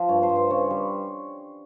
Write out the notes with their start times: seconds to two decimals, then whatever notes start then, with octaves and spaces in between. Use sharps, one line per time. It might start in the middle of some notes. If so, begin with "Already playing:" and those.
Already playing: F3
0.09 G2 C#5
0.23 C5
0.29 G2
0.36 C5
0.50 C#3 C#5
0.70 G3